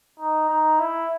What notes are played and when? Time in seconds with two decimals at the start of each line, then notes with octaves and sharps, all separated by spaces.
0.20 D#4
0.49 D#4
0.79 E4